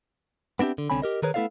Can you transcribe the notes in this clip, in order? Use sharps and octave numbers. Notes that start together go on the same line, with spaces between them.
B3 C4 D4 E4 G4
D3
C2 D3 C4 C#4 G#5 B5
G4 A#4 D#5
D#3 G#4 A#4 B4 C#5
A3 B3 E4 A4 D5 F5